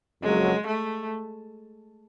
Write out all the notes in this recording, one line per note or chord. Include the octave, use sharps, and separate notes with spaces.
F2 C#3 F#3 G#3 A#3
A3